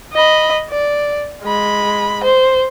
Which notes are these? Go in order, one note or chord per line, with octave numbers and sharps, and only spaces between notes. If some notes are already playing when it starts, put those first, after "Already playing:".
D#5 B5
D5
G#3 B5
C5